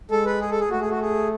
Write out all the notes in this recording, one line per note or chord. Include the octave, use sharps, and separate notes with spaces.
G#3 A4
B4
G#4
A4
G#4
A3 F#4
G#4
F#4
G#4